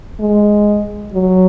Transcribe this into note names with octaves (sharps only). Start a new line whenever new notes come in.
G#3
F#3